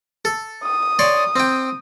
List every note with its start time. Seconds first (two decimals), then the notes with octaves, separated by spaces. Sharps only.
0.25 A4
0.64 D#6
0.99 C#5 D5 C6
1.36 C4 G5